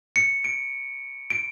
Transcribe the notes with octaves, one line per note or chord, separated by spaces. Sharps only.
C#7
D7
D7